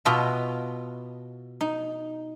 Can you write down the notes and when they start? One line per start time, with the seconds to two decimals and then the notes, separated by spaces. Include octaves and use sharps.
0.05 B2 F4 F#4 D#5 E5 A5
1.61 D#4